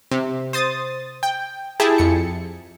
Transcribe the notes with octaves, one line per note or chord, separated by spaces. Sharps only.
C3
C5 D#6 A6
G5
E4 G4 G#4 A5
F2 C#7